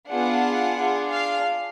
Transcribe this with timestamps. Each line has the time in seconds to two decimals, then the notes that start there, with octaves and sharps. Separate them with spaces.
0.09 B3 D4 F4 G#4 F#5
0.75 D4 F4 G#4
1.08 F5